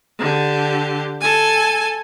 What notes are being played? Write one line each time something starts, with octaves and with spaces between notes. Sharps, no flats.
D3 G4
A4 G#5